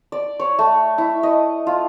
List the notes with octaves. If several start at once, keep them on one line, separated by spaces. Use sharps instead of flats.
D5
C#5
A3
E4
D#5
F4